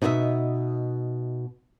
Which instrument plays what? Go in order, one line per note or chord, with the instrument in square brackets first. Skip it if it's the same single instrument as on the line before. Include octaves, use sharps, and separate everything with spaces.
[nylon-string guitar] B2 D#4 F#4 C5 D#5 E5